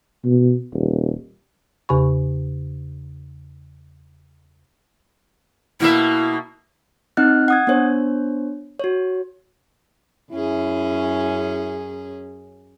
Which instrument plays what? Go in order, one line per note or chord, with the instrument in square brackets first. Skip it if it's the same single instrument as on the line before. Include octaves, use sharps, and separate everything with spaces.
[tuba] B2
D#1
[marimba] E2 C#3 G4 G#5 B5 C#6
[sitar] B2 A#3 E5 [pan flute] E4
[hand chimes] C4 D#4 D#5 F#5 F6 F#6
F#5 D#6 G#6
B3 D4 C5 C#5
F#4 C#5
[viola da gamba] F#2 C#4 G#4 [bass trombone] E4